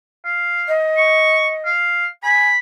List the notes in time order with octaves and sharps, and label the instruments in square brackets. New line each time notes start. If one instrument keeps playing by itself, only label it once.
[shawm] F5
[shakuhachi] D#5
[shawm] C#6
F5
[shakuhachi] G#5 [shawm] B5